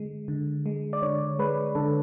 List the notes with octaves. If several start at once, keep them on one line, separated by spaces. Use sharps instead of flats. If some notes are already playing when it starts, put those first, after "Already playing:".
Already playing: D3 G#3
D3
G#3
D5
D3 C#5
G#3 B4
D3 A4